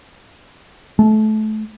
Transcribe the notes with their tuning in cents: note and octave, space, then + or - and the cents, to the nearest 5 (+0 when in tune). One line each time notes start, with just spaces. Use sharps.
A3 -25